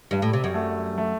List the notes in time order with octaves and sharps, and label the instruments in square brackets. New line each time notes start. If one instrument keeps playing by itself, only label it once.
[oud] G2 [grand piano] G3
[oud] A2
C3
F#2
[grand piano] A3
A3